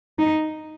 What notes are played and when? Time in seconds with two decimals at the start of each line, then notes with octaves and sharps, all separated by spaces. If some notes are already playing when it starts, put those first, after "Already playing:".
0.19 D#4